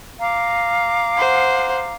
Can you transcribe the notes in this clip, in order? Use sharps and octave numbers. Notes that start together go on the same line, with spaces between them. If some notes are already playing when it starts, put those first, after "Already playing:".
F5 A#5 D6
C5 F#5